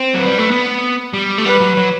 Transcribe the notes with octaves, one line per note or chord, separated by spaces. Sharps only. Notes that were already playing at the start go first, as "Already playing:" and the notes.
Already playing: C4
F#3 B4
G3
A3
B3
G3
A3
G3 B4
F#3
F#3